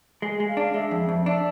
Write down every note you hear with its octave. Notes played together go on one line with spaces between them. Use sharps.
G#3 G#5
G#3
F5
D4
G#3 E5
F2
F2
D4 E5